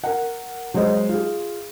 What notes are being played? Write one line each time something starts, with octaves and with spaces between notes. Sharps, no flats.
A#4 F#5
F#3 G#3 G#4 C5 D#5
F4 G#4